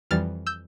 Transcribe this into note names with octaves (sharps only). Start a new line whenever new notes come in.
F2 E3 G3 F6 A6
E6 G6